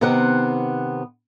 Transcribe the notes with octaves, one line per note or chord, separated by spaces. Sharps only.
C3 D#3 B3 C4 F#5